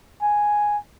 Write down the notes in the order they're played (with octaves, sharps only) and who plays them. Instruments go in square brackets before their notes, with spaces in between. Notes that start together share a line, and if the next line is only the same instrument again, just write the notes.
[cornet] G#5